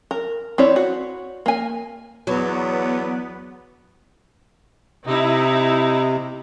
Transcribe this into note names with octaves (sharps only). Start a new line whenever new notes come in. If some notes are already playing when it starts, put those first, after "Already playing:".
A#4
C4 E4 C#5 D5
F#4
A#3 G#5
E2 F#3 B3 C#5 D5
C3 D#4 E4